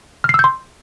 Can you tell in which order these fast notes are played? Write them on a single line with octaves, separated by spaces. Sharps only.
F6 C7 E6 G6 C6